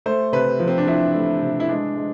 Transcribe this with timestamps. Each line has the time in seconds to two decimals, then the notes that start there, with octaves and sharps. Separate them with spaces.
0.06 A3 C5
0.32 C3 B4
0.60 F3
0.68 C4
0.78 D4
0.87 F3 E4
1.14 A3
1.42 C3
1.60 E4
1.69 G#3 D4
1.97 G#3